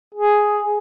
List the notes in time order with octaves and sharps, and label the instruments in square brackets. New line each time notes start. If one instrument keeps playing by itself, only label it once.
[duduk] G#4